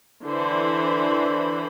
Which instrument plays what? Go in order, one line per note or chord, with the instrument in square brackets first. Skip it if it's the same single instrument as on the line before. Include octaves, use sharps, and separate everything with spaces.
[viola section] D3 E3 C5 B5